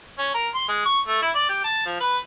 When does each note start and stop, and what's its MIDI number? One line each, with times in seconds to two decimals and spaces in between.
0.18 0.30 61
0.34 0.49 70
0.55 0.65 84
0.69 0.84 56
0.86 0.99 85
1.08 1.20 57
1.22 1.30 64
1.35 1.47 74
1.49 1.61 67
1.64 1.82 81
1.86 1.97 53
2.01 2.17 71